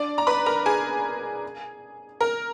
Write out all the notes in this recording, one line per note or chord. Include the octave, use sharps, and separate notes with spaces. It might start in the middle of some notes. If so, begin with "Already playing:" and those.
Already playing: D4 D5
A#5
B4 B5
A#4 A#5
G#4 G#5
A#4